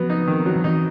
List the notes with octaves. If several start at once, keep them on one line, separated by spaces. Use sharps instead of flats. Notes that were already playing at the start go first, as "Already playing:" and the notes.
Already playing: F3 F#3 B3
D#4
D#3
F#3
F3
E3 D#4